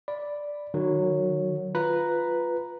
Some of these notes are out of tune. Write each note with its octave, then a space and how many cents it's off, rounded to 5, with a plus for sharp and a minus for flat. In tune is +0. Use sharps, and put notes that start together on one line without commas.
D5 +0 B5 +0
D#3 -30 F#3 +0
F4 +0 B4 +0 A#5 +0